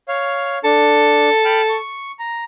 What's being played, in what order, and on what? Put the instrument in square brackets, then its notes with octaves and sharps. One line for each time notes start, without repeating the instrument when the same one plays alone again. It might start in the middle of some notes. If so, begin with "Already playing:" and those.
[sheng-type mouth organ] C#5 F5
[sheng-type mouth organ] D4 [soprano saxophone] A4
[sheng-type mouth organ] G5 B5 F6
C#6
A#5